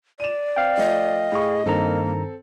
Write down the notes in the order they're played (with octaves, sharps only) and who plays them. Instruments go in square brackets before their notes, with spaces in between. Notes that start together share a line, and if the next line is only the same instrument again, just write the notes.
[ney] D5 [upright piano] D#7 E7
[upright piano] C4 [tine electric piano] F5 G5
[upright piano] F3 A3 [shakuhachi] D#5
[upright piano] A2 C#6 [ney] G#4
[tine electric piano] G2 D#3 A#5 [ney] A#3 [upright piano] C4 A4